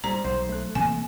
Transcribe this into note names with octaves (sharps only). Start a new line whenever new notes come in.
G#2 G3 C5 A#5
B1 C5
A3 F#6
C3 E3 A#3 G#5